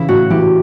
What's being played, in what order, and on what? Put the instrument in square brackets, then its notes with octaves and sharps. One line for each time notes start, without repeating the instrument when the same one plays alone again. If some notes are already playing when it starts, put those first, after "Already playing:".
Already playing: [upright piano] C#3 E3 [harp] E4
[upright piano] A2 [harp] F#4
[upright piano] E3 [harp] G4